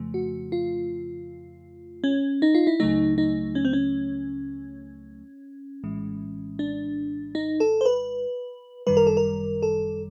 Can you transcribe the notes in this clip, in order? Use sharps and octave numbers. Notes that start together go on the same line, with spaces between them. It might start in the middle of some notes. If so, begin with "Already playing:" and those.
Already playing: F2 C#3 F3 A3
F#4
F4
C#4
D#4
F4
E4
C#2 C#3 F#3 A3 D#4
D#4
C#4
C4
C#4
A#1 A2 E3 G#3
D4
D#4
A4
C5
B4
G1 F#2 D#3 G3 B4
A#4
A4
A#4
A4